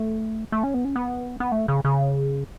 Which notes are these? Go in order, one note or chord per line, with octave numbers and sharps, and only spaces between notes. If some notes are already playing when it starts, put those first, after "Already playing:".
Already playing: A3
A3
C#4
B3
C#4
B3
B3
A3
C#3
C#3